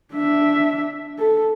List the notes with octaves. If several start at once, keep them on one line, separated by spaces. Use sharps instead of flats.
D4 E5
A4